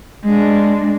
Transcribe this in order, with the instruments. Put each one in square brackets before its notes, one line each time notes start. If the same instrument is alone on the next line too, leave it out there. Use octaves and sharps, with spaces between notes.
[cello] G#3 D4